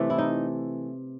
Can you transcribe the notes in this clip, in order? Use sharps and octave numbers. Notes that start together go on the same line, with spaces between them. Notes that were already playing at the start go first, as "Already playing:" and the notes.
Already playing: C3 E3 A3
E4
D#4